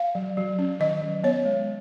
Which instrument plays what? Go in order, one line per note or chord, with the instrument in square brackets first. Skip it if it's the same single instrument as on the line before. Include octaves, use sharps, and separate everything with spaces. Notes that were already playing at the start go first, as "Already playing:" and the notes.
Already playing: [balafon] F5
F#3
F#3
C#4
D#3 D#5
F#3
B3 C#5
G#3